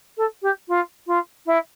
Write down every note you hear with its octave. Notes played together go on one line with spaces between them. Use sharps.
A4
G4
F4
F4
E4